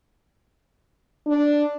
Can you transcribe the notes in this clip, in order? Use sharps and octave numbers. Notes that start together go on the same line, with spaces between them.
D4